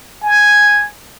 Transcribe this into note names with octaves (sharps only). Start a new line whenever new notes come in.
G#5